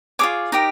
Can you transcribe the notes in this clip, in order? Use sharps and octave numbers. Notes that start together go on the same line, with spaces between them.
F4 G#4 C#5 D6
D#4 G4 A#4